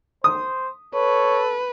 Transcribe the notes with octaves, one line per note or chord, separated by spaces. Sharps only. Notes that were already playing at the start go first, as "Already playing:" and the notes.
C5 D#6
A4 B4 C#5